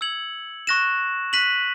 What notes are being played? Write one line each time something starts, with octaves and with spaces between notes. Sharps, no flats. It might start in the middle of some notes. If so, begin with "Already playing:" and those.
E6 G#6 C#7 F#7
C#6 F#6 A#6 E7
F#6 B6 D#7 F#7